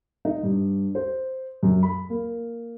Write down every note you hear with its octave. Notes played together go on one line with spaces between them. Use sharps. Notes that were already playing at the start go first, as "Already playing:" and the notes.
D#4
G2
C5
F#2
B5
A#3